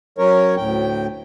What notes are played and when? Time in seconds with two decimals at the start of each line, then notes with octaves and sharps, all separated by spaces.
0.18 F#3 C#4 A#4 C#5
0.57 D2 A2 G5